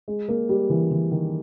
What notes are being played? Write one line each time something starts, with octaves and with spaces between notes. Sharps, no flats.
G#3
A#3
G3
E3
E3
D#3